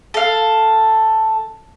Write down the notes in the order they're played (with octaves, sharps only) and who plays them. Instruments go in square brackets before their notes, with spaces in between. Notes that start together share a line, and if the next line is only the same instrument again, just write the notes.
[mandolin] A4 F5